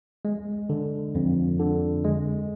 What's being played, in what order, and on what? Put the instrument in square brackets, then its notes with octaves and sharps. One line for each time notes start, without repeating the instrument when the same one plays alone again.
[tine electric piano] G#3
D3
F2
D3
G#3